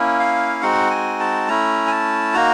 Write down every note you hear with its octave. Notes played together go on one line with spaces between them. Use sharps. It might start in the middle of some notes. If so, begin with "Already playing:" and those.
Already playing: A#3 C#4 E4
F5
G#3 C4 D#4 F#4 F#5
G#5
A5
A3 C#4 E4 A#5
G#5
A5
A#3 D#4 F#4 A#5